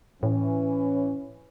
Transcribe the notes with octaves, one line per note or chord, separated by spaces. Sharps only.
A2 E3 C#4